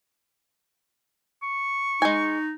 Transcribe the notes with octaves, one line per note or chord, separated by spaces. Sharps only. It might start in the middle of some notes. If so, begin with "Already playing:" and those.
C#6
G#3 D#4 G#5